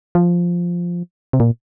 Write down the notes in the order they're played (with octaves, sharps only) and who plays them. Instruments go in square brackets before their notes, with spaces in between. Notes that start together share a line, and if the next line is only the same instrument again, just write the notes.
[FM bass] F3
C3
A#2